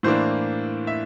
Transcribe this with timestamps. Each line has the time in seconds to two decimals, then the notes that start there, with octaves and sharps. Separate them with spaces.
0.03 A2 E3 A#3 D4 C5
0.87 E5